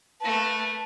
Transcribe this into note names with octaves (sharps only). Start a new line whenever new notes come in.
A3 B4 A5